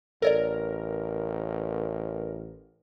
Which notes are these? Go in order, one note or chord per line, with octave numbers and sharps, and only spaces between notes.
A1 A4 A#4 C#5 D5